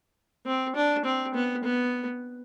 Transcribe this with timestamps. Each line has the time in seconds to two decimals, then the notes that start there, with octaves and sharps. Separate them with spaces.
0.46 C4
0.76 D4
1.05 C4
1.35 B3
1.64 B3